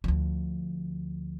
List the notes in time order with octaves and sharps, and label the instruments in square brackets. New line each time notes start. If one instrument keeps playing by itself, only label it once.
[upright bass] D2 F3